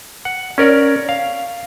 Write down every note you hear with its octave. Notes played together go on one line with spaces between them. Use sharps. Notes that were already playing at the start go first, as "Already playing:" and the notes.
F#5
C#4 A#4 D5
F5